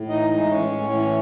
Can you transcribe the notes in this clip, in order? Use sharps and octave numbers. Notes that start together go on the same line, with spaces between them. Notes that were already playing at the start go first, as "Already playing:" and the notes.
Already playing: A2
E3 D#4 D#5
G#3 D#4 D#5
A2 C#4 C#5
A2
E3